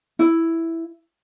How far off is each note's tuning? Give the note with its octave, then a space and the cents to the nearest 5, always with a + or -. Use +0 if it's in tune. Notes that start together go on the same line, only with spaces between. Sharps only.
E4 +0